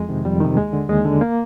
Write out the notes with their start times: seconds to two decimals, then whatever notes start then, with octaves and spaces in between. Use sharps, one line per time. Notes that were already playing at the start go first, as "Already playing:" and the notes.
Already playing: F2 G#3
0.09 C3 D#3
0.25 F2 G3
0.41 C3 D#3
0.57 D#2 G#3
0.73 D3
0.89 D#2 G#3
1.05 D3
1.21 A#3